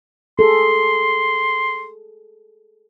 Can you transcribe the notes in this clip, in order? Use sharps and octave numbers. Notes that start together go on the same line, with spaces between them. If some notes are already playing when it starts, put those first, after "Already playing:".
G#4 A4 C6